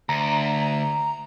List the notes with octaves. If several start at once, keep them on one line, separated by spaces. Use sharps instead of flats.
D2 A#5